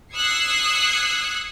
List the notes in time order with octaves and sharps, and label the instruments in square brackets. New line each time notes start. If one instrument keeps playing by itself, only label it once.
[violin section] D#6 E6 F#6 G#6 C7 C#7